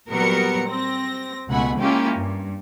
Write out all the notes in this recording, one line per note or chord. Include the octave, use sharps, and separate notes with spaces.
A#2 F#3 G3 B3 A#4 C#7
C4 A#6
C#2 B2 A3 F#5 G#5 B5
G#3 A#3 C#4 E4 F4 G4
G2